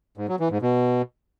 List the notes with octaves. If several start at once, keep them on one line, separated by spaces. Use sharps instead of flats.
G#2
F#3
E3
G#2
B2